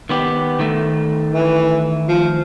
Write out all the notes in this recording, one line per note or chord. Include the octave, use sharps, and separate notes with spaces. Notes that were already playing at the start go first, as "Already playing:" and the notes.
D#3 B3 G4
D#3 A3
E3
F3